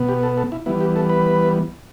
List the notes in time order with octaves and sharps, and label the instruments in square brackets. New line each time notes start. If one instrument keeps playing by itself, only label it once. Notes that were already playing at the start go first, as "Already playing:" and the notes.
Already playing: [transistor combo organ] B2 B3
G4
A4
A4
E4
E3 G3 B3 E4
G4
A4
B4